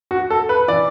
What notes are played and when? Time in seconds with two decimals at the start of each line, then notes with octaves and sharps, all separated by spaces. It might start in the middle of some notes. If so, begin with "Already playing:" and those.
0.11 F#4
0.30 A4
0.49 B4
0.68 E3 D5